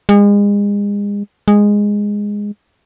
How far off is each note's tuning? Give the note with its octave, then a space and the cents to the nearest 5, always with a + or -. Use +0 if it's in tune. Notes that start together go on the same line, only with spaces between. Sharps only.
G#3 -35
G#3 -10